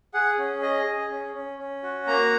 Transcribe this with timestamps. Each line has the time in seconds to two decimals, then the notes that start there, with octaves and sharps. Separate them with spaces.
0.14 G#4 F#5
0.38 C#4
0.62 G#4 D#5
0.86 G#4
1.10 C#4
1.35 C#4
1.59 C#4
1.83 F#4
2.07 A#3 A#5